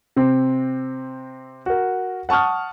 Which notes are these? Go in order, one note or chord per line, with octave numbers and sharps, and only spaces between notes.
C3 C4
F#4 A#4
F#5 A5 C#6 D#6 F6